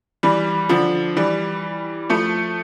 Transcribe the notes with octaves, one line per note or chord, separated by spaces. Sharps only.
E3 G3
D3 F3
E3 G3
F3 A3